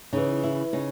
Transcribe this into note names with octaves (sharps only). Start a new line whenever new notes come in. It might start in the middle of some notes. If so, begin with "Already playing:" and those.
C#3 E3 D#4
E4
C#3 D#4